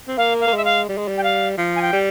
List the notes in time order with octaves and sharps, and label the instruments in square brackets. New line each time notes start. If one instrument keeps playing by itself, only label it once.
[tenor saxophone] C4
[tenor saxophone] A#3 [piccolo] F5
[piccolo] F5
[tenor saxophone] A#3
G#3
[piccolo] E5
F5
[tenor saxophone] G3
G#3
G3
[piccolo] G5
F5
[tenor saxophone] F3
[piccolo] G#5
G5
[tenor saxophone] G3